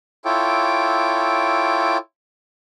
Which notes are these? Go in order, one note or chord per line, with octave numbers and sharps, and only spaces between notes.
E4 F4 A4 C#5 G5 D6